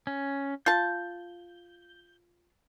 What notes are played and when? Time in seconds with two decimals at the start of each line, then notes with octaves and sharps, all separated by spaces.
0.07 C#4
0.66 F4 A5 G6